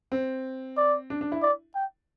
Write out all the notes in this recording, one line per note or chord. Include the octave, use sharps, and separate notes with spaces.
C4
D5
D4
D4
E4
D5
G5